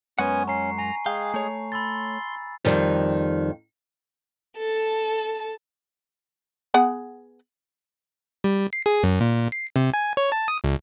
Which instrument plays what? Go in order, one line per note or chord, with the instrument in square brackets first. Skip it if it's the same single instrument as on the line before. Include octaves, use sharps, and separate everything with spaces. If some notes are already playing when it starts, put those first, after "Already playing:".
[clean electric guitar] F#2 G#3 F#5 [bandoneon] B3 C#4 G#5 [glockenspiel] C#6
[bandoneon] C#4 [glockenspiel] A#5 C7
[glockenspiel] G#5 [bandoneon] A#5
[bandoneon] G#3 G#4 [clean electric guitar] F5 G5
[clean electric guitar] A3 C#5
[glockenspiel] B5 E6 A6 [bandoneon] C6
[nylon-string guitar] F2 D#3 G3
[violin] A4 A5
[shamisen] B3 G#4 F#5
[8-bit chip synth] G3
C7
G#4
F#2
A#2
C7
C3
G#5
C#5
A5
D#6
C#2